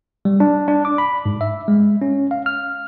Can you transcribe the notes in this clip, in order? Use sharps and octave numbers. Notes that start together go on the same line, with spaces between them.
G3
D4
D4
D6
B5
G#2
E5
G#3
C#4
F5
F6